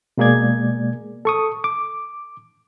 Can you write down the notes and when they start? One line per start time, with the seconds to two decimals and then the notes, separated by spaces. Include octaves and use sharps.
0.18 B2 G#3 A#3 G#4 D5 G#6
1.25 A4 C#6 D#6
1.64 D6